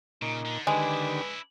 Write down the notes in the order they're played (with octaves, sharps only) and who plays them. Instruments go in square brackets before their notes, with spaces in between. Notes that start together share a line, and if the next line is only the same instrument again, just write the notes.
[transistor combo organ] A#2 [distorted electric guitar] C#3 [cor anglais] D#4
[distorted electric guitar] D3
[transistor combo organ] D3 D#3 G4 [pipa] G#3 [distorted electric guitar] D4 E4 [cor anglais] B4